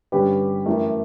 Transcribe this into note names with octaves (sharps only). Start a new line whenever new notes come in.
G2 D3 G3 C#4 G4 B4
F#2 E3 A3